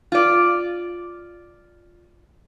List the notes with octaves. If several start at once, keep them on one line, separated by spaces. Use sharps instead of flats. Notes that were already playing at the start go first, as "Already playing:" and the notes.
F4 D5